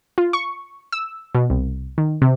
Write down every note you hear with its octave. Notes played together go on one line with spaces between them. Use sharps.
F4
C#6
E6
B2
C2
D#3
C3